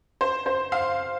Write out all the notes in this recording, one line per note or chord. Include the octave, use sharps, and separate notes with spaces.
C5
C5
F5